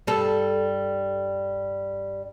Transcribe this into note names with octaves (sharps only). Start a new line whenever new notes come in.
G2 G3 A4